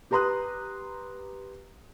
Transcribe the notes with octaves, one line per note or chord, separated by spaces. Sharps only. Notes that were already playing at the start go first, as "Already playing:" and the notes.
G4 B4 A#5 C6 D#6 F#6